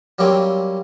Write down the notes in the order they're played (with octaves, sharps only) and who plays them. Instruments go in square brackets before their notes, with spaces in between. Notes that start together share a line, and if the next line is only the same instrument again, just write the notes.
[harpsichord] F#3 G3 A#3 C4 C#4